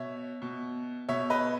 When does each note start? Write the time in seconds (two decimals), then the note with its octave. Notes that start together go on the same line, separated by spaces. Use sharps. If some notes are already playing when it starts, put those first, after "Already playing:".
Already playing: B2 C#5 E5
0.42 B2
1.09 B2 C#5 E5
1.30 B4 D#5